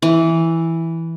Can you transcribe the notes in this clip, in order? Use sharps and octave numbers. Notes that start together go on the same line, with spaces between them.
E3